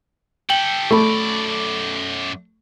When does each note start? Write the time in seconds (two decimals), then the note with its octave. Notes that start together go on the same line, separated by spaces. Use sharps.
0.50 G4 A4 G5 F#7 G7
0.91 F#2 A3 D5 B5 C#6